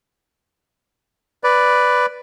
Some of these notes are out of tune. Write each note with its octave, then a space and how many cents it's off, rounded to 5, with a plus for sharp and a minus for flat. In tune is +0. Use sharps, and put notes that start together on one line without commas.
B4 +5 D5 +0